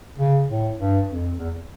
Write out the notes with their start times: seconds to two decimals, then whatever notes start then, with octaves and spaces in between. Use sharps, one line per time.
0.18 C#3
0.48 A2
0.78 G2
1.09 F2
1.39 E2